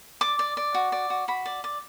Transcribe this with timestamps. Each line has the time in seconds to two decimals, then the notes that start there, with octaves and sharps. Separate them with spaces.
0.21 D5 D6
0.39 D5
0.57 D5
0.74 F#4
0.92 D5
1.10 F#4
1.28 F#4 B5
1.46 D5
1.64 D5